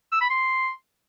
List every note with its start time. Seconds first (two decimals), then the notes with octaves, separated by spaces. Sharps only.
0.12 E6
0.21 B5
0.30 C6